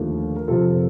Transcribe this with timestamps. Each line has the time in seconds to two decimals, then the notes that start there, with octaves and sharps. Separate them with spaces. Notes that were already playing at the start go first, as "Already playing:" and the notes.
Already playing: D#2 D3 F3 A3 F4 A4
0.36 A#4
0.48 F2 C3 F3 F4 A4